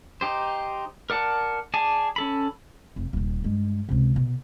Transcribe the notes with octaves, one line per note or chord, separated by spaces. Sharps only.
D#4 G4 C5
A#4 D5 F#5 A5
G#4 D5 G#5 A5
C#4 A4 B5
F1
D#1 A#2
G2 G#3
C#2 C3
B2